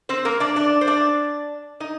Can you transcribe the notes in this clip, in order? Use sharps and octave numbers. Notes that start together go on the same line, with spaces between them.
C4 C5
A#3 A#4
D4 D5
D4 D5
C5
D4 D5
D#4 D#5